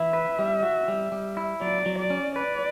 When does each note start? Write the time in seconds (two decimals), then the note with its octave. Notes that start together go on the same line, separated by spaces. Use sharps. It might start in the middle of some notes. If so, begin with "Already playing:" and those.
Already playing: E3 E4 E5
0.13 B4
0.39 G3
0.63 F#4
0.88 G3
1.12 G3
1.37 E4
1.61 F#3 D5
1.86 F#3
1.98 D5
2.10 C#4
2.35 B4 D5